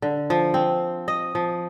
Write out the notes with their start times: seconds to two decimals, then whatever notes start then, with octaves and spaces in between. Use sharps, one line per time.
0.02 D3
0.30 F3
0.54 C4
1.08 D#5
1.35 F3